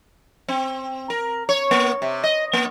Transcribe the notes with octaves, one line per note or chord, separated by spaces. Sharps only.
C4
A#4
C#5
A#3
C3
D#5
A#3